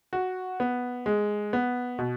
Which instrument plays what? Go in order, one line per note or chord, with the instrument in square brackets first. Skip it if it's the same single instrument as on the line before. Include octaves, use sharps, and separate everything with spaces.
[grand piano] F#4
B3
G#3
B3
B2